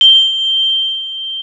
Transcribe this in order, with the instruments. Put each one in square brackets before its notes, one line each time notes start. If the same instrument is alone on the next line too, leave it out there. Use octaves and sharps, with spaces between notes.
[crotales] G7